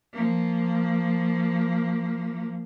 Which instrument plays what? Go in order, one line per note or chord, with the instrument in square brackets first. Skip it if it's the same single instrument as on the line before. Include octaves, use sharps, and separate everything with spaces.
[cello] F3 A#3